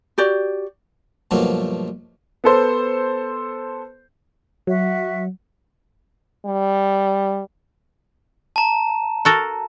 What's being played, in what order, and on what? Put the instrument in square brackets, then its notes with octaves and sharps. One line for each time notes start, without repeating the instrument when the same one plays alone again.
[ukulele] F#4 G4 D5
[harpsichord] G2 B2 F3 F#3 A3 A#3
[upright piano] B3 A4 C5
[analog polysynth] F#3 [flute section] F#4 E5 F#5
[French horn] G3
[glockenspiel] A5 A#5
[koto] F#4 A4 A#4